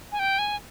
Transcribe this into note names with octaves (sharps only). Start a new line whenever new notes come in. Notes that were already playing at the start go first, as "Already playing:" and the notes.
G#5
G5
G#5